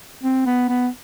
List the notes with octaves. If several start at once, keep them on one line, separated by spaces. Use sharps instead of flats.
C4
B3
B3